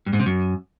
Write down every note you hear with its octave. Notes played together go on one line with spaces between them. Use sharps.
G2
G#2
C3
F#2